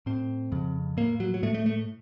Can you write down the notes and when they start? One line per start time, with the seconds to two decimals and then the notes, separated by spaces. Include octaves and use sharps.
0.06 A2 C4
0.52 F2 C#3
0.97 A2 A#3
1.20 F#3
1.34 F#3
1.43 A2 A3
1.54 A3
1.66 A3